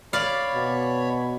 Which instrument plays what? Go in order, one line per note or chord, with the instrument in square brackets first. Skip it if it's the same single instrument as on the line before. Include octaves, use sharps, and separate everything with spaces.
[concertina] C#5 B5 [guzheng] D5 F5
[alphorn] B2